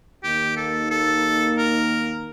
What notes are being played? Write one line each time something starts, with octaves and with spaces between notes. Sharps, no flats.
D#2 D#3 A#3 D#4 G4
A4
A4
A#4